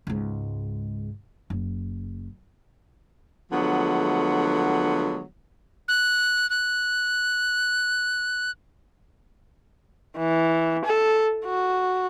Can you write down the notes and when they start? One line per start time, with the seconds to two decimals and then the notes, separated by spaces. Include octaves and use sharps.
0.07 C#2 G#2
1.50 F#1
3.51 D3 F3 F#3 G#3 A3 B3
5.88 F#6
6.50 F#6
10.17 E3
10.85 A4
11.45 F#4